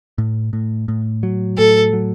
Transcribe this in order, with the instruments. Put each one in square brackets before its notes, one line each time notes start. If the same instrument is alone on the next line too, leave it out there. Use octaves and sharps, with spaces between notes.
[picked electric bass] A2
A2
A2
F#3
[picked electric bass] A2 [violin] A4
[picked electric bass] F#3